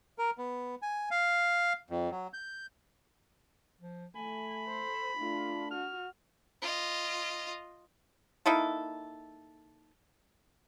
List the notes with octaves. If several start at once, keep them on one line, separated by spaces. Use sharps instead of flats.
A#4
B3
G#5
F5
F2
F#3
G6
F3
A3 G#5 B5
A4 C5
A3 D4 F4
F#4 F6
F4 D#5
A#3 D#4 E4 A4